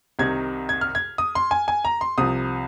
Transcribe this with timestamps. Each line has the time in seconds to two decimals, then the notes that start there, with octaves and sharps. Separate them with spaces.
0.19 C2 C3 D#3 G#6
0.69 G#6
0.81 F6
0.95 G#6
1.18 D#6
1.35 C6
1.51 G#5
1.68 G#5
1.85 A#5
2.01 C6
2.18 C2 C3 F3 D#6